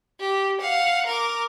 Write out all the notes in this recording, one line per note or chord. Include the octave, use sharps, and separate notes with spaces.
G4
F5 F#5
A#4 D6